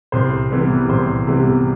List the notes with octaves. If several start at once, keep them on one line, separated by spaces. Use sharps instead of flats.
C2 C5
C3 E3 G3 B3
C2 C5
C3 E3 G3 B3